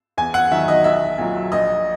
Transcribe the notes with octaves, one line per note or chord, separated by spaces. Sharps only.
E2 G#5
F#5
D#3 F#3 E5
D#5
B1 E5
A#2 F#3
A#1 D#5